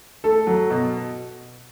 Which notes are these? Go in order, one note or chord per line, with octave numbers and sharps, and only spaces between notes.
A3 A4
F#3
B2